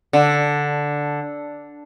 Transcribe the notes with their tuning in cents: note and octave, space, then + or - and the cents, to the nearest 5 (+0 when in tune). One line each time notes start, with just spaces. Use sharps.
D3 -5